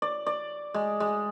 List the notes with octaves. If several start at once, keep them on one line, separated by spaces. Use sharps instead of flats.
D5
D5
G#3
G#3